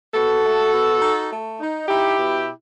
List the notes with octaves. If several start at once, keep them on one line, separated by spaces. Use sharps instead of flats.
B2 F#4 A4
A3
B2
D#4
A3
D#4
D#4 E4 G4
B2